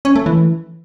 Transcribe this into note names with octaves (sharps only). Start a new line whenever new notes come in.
C#4
A3
E3